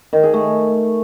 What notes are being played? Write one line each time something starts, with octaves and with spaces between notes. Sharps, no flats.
D#3
G#4
A3